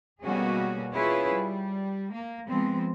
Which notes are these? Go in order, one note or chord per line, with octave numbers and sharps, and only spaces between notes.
B2 G3 A#3 C#4 F#4 G#4
C#4 E4 F4 G#4 B4 C#5
G3
A#3
F3 G#3 B3 C4